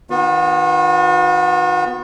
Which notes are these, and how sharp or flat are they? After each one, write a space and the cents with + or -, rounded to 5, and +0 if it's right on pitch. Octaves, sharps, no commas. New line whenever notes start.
D#3 +0 B3 +0 F#4 -45